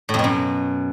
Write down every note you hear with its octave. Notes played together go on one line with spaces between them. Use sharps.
A2
F2
B2
F#2